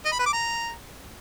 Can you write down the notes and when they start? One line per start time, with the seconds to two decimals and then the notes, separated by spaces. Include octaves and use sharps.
0.05 D#5
0.12 B5
0.19 B4
0.26 D6
0.33 A#5